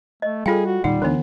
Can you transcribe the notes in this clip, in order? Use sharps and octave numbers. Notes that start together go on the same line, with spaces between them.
A3 D#5
G3 F4 G#4 A4 F5 G5
F#4
E1 A#2 D#3 G3 D#4 F#5
D2 D3 E3 B3 D4